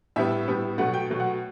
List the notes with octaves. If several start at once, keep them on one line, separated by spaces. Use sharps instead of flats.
A2 G3 B3 E5
A2 G3 B3
B2 F#3 A3 F#5
G5
B2 F#3 A3
F#5